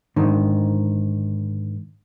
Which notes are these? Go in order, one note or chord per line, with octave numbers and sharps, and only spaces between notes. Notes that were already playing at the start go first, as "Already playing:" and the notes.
G#2 D3 D#3